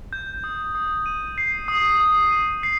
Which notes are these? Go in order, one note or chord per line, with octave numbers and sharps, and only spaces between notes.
G6
D#6
D#6
D#7
C7
D#6
D#6
D#7
C7